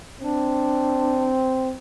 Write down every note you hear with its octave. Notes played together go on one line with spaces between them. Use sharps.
C4 D4